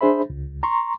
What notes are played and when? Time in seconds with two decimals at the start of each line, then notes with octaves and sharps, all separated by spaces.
0.01 D4 G#4 C5 E5 B5
0.30 C#2
0.63 A#5 C6 C#6